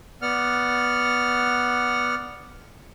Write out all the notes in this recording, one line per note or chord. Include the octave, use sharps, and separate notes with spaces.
B3 D5 F#5 F6